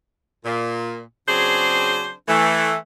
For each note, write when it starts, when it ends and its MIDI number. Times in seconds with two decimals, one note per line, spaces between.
0.45 1.01 46
1.29 2.12 49
1.29 2.12 54
1.29 2.12 60
1.29 2.12 62
1.29 2.12 68
1.29 2.12 72
2.28 2.76 52
2.28 2.76 57